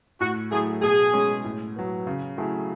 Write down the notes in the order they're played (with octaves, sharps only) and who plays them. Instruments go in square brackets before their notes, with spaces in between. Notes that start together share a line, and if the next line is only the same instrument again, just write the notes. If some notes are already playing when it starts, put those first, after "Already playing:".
[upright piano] A2 [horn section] F#4
[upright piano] F#3 A3 E4 [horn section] G#4
[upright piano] B2 [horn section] G#4
[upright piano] G#3 C#4
A2
F#3 B3
C#3
F#3 A3 E4 G#4